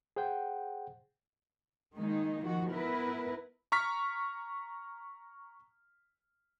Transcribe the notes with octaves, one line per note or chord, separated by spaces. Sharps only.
G#4 C5 F#5 G5
D#3 G#3 A#3 D#4
D#3 F3 F#4
B3 E4 A#4 B4
A#5 C#6 F6 B6